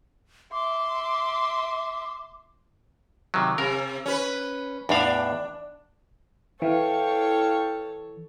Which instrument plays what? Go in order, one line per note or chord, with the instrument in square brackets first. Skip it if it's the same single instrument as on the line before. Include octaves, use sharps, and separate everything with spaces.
[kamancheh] E5 C6 [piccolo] D6
[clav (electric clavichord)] C3 D#3 F#3
[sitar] C3 [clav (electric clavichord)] A#4
[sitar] C#4 B4
[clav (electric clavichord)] E2 A2 F5 [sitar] D4
[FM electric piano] E3 [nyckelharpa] A4 C#5 [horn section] F5 G5